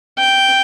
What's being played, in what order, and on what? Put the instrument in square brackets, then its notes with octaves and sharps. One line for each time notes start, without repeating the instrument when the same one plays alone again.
[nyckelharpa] G5